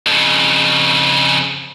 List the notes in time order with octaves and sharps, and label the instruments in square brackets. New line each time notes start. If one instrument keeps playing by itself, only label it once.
[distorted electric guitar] F2 C#3